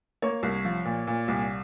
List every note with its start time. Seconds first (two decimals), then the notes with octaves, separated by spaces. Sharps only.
0.22 A#3 C#5
0.43 C2
0.65 F3
0.85 A#2
1.07 A#2
1.28 C2